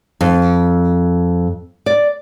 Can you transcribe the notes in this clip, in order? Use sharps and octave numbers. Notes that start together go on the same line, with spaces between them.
F2
D5